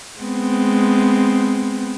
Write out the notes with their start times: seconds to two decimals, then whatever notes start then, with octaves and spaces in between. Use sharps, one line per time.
0.21 G#3 B3 C4